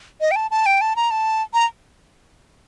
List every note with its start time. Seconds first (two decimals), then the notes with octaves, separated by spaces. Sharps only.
0.21 D#5
0.31 G5
0.36 A5
0.51 A5
0.66 G5
0.81 A5
0.96 A#5
1.11 A5
1.54 A#5